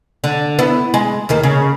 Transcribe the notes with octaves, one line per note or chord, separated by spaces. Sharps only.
D3
B3 E4
G#3
D#2 D#3 A#3
C#3